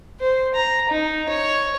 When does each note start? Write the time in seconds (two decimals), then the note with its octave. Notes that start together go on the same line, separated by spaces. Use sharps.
0.21 C5
0.55 A#5
0.90 D#4
1.29 C#5